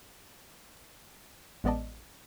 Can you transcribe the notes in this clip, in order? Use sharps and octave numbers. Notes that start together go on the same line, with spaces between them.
A1 G#3 B3 D5 D#5 A5